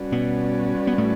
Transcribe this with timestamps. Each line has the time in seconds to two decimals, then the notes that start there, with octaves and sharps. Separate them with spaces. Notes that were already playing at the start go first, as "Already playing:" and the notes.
Already playing: G3 C#4 F#4 B4 D5
0.12 B2 B3
0.87 B3
0.98 A2 A3